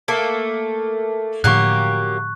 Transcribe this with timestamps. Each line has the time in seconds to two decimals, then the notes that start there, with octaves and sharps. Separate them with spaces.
0.08 A3 A#3 A4
1.44 A2 D3 F3 F#3 A#3 G4 C#6 F#6